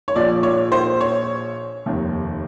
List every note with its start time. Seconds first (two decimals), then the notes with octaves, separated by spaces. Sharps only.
0.08 C#5
0.15 A#1 A#2 F3 D5
0.43 C#5
0.72 C5
1.01 C#5
1.86 F1 D#2 D#3